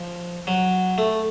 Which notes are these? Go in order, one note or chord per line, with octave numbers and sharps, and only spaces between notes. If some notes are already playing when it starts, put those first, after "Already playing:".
Already playing: F3
F#3
A3